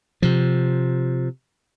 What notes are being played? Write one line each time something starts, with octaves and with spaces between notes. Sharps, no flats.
C3 F3